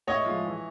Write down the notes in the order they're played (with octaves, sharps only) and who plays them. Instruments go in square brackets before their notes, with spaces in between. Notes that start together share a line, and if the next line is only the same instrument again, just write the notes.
[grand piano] A2 [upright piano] C#5 D#5
[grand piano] F3 G#3
E3